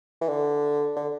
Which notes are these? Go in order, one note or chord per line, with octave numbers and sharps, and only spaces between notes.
E3
D3
D3